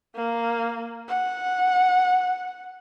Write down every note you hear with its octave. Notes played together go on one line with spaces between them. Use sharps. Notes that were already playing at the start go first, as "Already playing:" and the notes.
A#3
F#5